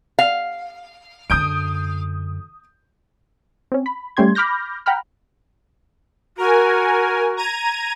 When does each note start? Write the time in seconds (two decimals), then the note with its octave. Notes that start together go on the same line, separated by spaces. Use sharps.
0.19 F5
1.30 F#2 D3 D#6 G6 D7
3.72 C4 C#4
3.86 B5
4.17 G3 A3 C#4 G4 C6 G#6
4.35 B5 D6 F6 G6 A#6
4.86 F#5 G5 A#5 B5 F6
6.38 F#4 A#4 G#5
7.37 A#5 G#6 D#7